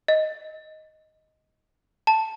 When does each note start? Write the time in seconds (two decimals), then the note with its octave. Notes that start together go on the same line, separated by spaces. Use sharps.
0.08 D#5
2.07 A5